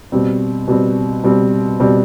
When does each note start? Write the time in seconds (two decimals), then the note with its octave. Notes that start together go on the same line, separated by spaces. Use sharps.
0.12 B2 G3 C4
0.68 B2 G3 C4
1.24 B2 G3 C4
1.80 B2 G3 C4